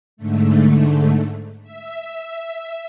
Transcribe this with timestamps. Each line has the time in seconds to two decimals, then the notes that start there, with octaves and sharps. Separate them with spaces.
0.17 G#2 D3 A3
1.63 E5